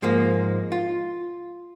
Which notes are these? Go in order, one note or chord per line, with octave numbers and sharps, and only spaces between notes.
G#2 F3 G#3 A#3
F4